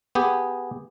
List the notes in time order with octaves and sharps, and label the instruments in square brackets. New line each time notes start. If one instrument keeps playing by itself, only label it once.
[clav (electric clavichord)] B3 G4 G#4